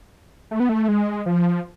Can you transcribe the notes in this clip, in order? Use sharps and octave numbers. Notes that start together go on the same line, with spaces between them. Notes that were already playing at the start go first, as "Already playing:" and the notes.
A3
B3
A3
G#3
F3